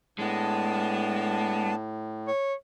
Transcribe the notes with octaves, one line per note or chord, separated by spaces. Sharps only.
A2 G#3 B3 D4 A5
C#5